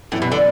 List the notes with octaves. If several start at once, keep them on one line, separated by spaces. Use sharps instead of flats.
F#2 A2 E3 B3 E4
B2
D3